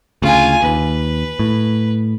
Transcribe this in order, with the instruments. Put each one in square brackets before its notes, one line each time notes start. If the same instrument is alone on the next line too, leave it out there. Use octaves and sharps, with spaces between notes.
[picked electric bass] D2 C#3 [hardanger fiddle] F4 G#5
[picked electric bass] D#2 [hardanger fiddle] B4
[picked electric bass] A2